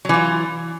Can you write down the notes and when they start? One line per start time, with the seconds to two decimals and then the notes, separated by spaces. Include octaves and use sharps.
0.05 F#3
0.09 E3
0.14 F4